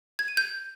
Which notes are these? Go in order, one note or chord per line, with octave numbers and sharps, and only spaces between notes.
G#6
D#7
G6